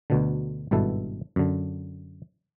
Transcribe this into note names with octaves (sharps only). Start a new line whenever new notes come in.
D2 B2 D3
G#1 G2 B2 E4 A4
F#2 D3